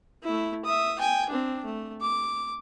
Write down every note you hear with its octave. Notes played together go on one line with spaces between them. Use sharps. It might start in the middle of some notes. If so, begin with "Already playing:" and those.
A3 E4
E5 D#6
G5 G#5
C4 D4
A3
D6